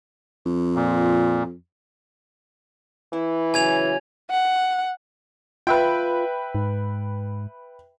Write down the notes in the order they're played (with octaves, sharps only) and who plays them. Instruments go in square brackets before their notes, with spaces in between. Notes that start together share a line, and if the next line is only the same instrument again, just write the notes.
[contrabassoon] F2
[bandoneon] A#2
[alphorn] E3 [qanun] E4
[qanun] C#3 F#3 [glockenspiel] G#5 G#6 F7
[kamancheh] F#5
[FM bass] F4 [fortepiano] B4 E5 G5
[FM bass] G#2